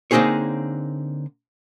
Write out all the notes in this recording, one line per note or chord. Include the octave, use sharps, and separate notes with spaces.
D3 A#3 C4 D#4 G#4 C#5